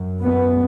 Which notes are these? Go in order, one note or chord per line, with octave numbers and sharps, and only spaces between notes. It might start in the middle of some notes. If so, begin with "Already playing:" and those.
Already playing: F#2
B3